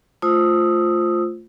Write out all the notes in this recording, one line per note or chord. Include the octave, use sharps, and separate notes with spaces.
A3 F4 C5 D#6 E6